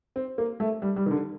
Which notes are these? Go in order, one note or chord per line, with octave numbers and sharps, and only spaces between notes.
C4
A#3
A3
G3
G3
D#3
D3